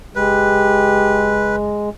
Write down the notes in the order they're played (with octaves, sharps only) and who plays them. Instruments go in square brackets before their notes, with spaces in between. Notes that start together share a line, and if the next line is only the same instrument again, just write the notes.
[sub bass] F#1 [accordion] G#3 [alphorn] G4 [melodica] B4